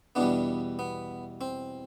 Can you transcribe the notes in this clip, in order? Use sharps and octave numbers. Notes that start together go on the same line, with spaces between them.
E2 B2 G3 B3 D4
B3
C4